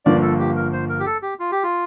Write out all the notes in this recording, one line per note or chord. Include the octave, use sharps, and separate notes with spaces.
G1 G2 F3 A#3 D5
A4
G4
A#4
C5
A#4
G4
A4
G4
F4
G4
F4